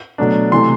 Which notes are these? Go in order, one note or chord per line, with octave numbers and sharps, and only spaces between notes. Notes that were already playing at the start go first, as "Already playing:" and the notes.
B2 F#3 A3 D4
C3 E3 A3 C6